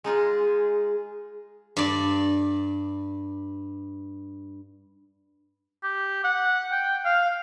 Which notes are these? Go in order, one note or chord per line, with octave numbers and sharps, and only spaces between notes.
G#3 D#4 F4 G#4
G2 D5
G4
F#5
G5
F5